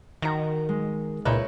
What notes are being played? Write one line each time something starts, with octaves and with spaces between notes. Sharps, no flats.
D#3 F#4 A#5
G#3
C#2 A#2 D#4 E4 B4 C#5 F#6